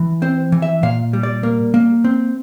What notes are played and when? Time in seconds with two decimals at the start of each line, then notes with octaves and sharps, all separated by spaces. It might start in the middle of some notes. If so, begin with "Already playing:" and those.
Already playing: E3
0.22 C4 C5
0.52 E3
0.62 E5
0.83 A#2 F5
1.13 G3
1.23 D5
1.43 A#3
1.74 A#3
2.04 C4